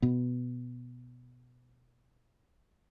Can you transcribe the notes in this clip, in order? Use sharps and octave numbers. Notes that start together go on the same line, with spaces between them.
B2 B3